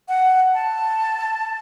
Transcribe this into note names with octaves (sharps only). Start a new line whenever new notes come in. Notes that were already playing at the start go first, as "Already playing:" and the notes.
F#5
A5